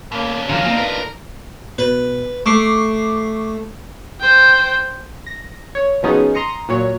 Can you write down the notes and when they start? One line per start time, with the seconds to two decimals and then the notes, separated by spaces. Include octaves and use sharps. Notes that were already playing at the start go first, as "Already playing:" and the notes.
0.12 B2 A#3 C#4
0.49 F#2 D3 E3 F3 D4 F5 A#5
0.65 A#3 C4 D4 D#4
0.77 F4 A#4 B4
1.78 B2 B4
2.46 A3 C#6 D6 C7
4.21 C5 G5
5.26 A#6
5.75 C#5
6.03 B2 F3 B3 C#4 D#4 G#4
6.34 A#5 C6 D#6 A#6 C#7
6.69 A#2 F#3 C#5